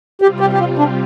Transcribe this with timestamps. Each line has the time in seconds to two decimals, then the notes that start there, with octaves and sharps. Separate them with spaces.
0.21 C3 G3 C4 F4 G4
0.40 G4
0.53 G4
0.59 F4
0.78 D4